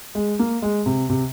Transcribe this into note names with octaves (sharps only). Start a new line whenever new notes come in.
G#3
A#3
G#3
C3
C3